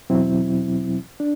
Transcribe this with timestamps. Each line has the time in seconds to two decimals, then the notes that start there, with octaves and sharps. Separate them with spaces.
0.10 E2 B2 F#3 C4 E4
1.20 D4